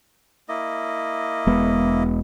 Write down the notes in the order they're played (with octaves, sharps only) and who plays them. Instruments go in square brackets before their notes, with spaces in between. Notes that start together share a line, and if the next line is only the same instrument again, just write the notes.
[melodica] A#3 E4 D#5
[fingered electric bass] E1 G#3 B3